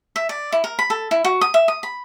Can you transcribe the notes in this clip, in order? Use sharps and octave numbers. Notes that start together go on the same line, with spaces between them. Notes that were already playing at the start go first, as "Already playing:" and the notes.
E5
D5
E4
A#4
B5
A4
E4
F#4
D#6
E5
D#6
B5